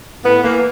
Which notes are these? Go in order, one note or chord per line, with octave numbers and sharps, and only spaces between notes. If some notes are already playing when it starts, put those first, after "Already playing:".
A2 B3
E3 A#3